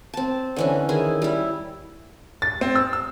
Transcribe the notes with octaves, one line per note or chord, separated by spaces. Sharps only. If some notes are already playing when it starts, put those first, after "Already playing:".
C4 A5
D3 E3 C#4
D#3 E4 G#4
G3 E4
A6
C4
E6
E6